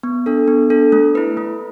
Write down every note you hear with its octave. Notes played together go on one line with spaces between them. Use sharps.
B3
D4 A4
B3
D4 A4
A3
E4 B4
A3